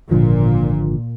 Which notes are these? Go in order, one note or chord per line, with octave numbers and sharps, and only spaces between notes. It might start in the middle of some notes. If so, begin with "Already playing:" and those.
G#1 A#2 D3 F3